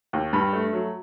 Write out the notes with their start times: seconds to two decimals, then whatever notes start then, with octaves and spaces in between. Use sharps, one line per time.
0.13 D#2
0.33 G2 B5
0.53 A3
0.73 F#3